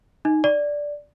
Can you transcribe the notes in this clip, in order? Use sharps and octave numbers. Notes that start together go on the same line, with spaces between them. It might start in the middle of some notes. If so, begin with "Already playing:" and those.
D#4
D5